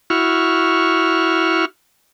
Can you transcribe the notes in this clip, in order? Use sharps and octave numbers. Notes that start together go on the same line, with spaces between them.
E4 F#4 C#6 F6